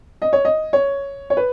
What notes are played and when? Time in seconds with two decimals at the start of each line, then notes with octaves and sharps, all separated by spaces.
0.22 D#5
0.33 C#5
0.45 D#5
0.73 C#5
1.30 C#5
1.37 B4